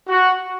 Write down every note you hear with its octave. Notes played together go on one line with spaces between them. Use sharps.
F#4